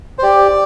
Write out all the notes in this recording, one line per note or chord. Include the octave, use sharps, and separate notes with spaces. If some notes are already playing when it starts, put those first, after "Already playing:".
C5
G4 D5